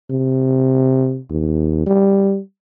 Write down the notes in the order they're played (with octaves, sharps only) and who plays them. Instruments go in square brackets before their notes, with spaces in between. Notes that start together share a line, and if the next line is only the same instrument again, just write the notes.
[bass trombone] C3
D#2
G3